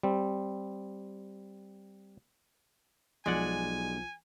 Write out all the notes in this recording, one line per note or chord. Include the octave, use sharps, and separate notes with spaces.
G3 C4
B1 F3 G#3 D5 F#5 G#5